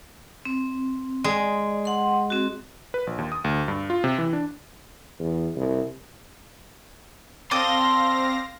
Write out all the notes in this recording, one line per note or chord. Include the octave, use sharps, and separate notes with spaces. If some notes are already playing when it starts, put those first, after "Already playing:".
C4
G#3 D5
F#5 C6
C4 F#4
B4
A#1
D#2
D#6
D2
G2
F4
C3
E3
D4
E2
C2
C4 A4 D5 F5 C6 D#6 A#6